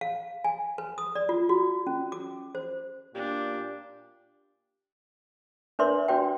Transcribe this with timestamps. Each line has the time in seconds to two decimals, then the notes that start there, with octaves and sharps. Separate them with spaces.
0.01 F5
0.44 G#5
0.78 B4
0.98 D#6
1.15 D5
1.29 F4
1.49 F#4
1.87 C#4
2.12 D6
2.55 C5
3.15 A#2 D4 G4
5.79 D4 A#4 B4 D5 E5 C6
6.08 D4 F#4 D5 G5